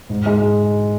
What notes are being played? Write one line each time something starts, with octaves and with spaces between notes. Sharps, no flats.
G#2
G#3